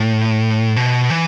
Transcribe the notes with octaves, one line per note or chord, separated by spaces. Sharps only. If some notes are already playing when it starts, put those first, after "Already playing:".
Already playing: A2
B2
E3